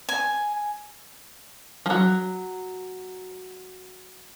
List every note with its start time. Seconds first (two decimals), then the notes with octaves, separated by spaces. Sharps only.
0.09 G#5
1.86 F3 F#3